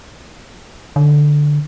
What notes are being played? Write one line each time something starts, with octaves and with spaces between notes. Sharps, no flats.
D3